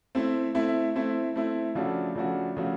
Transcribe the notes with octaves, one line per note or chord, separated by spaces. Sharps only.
A3 C4 E4
A3 C4 E4
A3 C4 E4
A3 C4 E4
C#3 F3 A3 D4 F#4
C#3 F3 A3 D4 F#4
C#3 F3 A3 D4 F#4